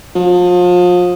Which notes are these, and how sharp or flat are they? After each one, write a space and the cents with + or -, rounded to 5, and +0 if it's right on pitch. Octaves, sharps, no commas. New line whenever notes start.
F3 +35